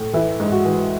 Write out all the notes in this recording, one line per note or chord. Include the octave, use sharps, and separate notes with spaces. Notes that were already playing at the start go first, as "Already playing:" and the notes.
Already playing: A2
E3 E4
G#2
F#4
E3